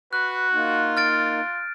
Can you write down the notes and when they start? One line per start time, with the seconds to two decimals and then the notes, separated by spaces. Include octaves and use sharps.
0.13 F#4 B4 F#6
0.53 A#3 D#4 F4
0.97 F6 A6 D7